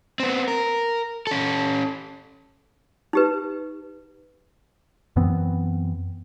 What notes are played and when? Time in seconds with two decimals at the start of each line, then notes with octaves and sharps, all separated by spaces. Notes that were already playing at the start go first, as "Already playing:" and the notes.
0.20 B3 C4
0.48 A#4
1.27 C#4 A4
3.13 D#4 G4 B4
5.16 F#2 E3 B3 C4